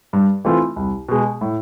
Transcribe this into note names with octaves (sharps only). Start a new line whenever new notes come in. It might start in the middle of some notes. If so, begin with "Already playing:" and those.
G2
E3 A3 C4 F4
C2
B2 G#3
A2